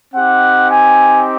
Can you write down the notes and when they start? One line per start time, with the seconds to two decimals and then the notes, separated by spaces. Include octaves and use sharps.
0.14 C4 D#4 G4 F#5
0.69 G#5